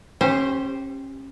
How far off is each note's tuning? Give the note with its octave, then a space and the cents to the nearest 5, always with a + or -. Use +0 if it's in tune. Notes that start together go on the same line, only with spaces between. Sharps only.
C#4 -30 G4 +0 C5 +0